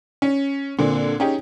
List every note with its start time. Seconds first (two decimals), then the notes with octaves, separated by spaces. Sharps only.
0.22 C#4
0.79 A#2 D3 C4
1.20 C#4 D#4 G4 G#4